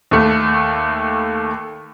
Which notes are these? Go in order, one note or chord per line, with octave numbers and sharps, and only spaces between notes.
D#2 A3